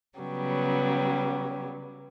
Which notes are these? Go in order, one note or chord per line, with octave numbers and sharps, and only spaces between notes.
C#3 F#3 G3 B3